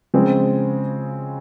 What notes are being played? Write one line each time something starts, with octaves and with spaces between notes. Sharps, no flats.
C#3 F3 G#3 C4